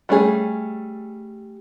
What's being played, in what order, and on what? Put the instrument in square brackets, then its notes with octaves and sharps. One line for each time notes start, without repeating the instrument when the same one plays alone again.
[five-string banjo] G3 A3 C#4 E4 G#4